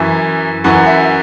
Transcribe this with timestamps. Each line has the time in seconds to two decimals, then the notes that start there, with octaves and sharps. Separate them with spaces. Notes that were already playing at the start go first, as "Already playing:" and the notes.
Already playing: F#2 E3 E5
0.64 F#2 E3 F#5
0.86 E5